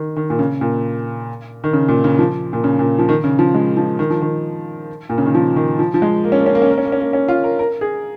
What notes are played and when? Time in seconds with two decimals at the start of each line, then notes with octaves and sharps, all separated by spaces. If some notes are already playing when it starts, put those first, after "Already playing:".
Already playing: D#3
0.16 D#3
0.30 A#2
0.39 C#3
0.61 A#2
1.64 D#3
1.73 C#3
1.88 A#2
2.04 C#3
2.19 F3
2.53 A#2
2.64 C#3
2.79 A#2
2.99 F3
3.09 D#3
3.24 C#3
3.39 F3
3.54 G#3
3.77 F3
3.99 D#3
4.10 F3
4.22 D#3
5.09 A#2
5.18 C#3
5.26 D#3
5.34 F3
5.56 D#3
5.79 F3
5.94 F3
6.02 G#3
6.24 A#3
6.32 C#4
6.39 A#3
6.46 C#4
6.55 A#3
6.62 C#4
6.70 A#3
6.78 C#4
6.85 A#3
6.92 C#4
7.00 A#3
7.13 C#4
7.28 F4
7.44 A#4
7.59 A#4
7.81 G#4